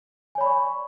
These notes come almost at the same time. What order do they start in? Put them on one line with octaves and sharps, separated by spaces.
G#5 C#5 B5 D5 C#6